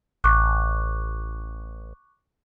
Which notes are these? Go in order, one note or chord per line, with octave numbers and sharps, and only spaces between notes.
A1 C#6 D6 F#6